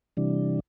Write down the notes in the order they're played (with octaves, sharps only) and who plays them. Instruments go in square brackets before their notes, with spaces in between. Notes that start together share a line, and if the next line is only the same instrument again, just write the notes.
[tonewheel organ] C3 E3 G3 D4